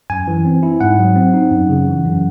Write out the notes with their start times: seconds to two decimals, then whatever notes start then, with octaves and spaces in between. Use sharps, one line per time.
0.10 F#2 G#5
0.27 E3
0.45 C4
0.63 E4
0.81 G#2 F#5
0.98 F#3
1.16 C4
1.34 D#4
1.51 F#2
1.69 C#3
1.87 E3
2.05 F#2